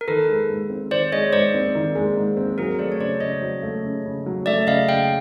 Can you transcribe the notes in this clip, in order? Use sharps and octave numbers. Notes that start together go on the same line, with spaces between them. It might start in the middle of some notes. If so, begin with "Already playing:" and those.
A#4
D#3 A4 B4
G#3
G#2
C4
D#3 C5 D5
G#3 C#5 D#5
G#2 C5 D5
C4
D#3
G#3
G#2
C4
F#3 G#4 A#4
A3 C5 D5
C#5
C#3 C5 D5
C#3 C#5 D#5
F#3
A3
C#3
C#3
F#3
A3 D5 E5
C#3 D#5 F5
C#3 F5 G5